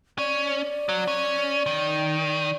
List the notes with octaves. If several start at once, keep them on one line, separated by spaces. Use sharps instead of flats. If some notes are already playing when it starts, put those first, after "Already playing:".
C#4 D5
F#3
C#4
D#3